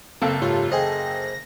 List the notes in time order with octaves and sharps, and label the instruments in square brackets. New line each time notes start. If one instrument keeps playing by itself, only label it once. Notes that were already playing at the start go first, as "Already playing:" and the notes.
[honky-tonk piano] F#1 A4 F5 [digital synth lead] C4
[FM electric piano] G#2 G4 C#5 [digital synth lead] F4
[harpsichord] G#4 D#5 [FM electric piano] C5 G5 [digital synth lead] A#6